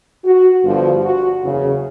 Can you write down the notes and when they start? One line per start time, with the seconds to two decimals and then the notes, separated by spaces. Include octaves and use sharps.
0.24 F#4
0.63 G1 G2 D3 F3
1.02 F#4
1.43 F#1 E2 C#3